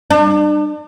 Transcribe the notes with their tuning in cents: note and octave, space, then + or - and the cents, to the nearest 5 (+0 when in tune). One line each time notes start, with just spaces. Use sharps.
D4 +35